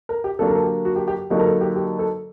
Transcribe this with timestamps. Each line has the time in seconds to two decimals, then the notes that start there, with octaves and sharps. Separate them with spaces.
0.09 A#4
0.24 G4
0.39 D3 F#3 A#3 D4 A4
0.48 A#4
0.55 A4
0.63 G4
0.85 F#4
0.96 G4
1.08 G4
1.30 D3 F#3 A#3 D#4 G4
1.39 A#4
1.46 A4
1.61 G4
1.76 G4
1.99 A4